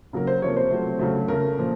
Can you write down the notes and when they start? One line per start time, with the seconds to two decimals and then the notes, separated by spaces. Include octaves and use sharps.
0.13 C#3 F#3 A#3 A#4
0.27 C5
0.42 C3 F3 A#3 C#5
0.56 C5
0.71 C3 F#3 A3
0.99 C#3 F#3 A3
1.28 C#3 A3 A#4
1.57 A#2 F3